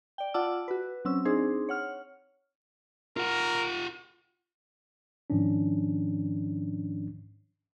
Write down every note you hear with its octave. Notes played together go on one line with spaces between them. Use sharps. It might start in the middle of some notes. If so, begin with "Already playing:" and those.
D5 G5
F4 D5 F#5 A5 D6 E6
F#4 B4
F#3 C4 C#4 E6
C4 D4 D#4 G#4 C5
C#5 F#5 F6
F4 A#4 F#5
G#2 D#3 F3 C#4 D4